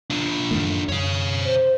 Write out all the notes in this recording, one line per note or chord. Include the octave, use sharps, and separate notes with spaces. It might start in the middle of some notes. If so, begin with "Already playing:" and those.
D4 F4
F#2 D#3 A3
F#2 C#5 F5
C5